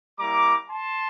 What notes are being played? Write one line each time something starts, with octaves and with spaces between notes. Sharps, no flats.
G3 A#3 E4 A#5 D6
A5 C6